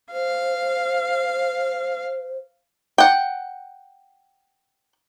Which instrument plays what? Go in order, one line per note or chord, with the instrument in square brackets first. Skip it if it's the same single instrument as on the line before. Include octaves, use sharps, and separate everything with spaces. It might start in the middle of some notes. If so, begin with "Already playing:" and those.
[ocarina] C5 [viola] F5
[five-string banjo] F#5 G5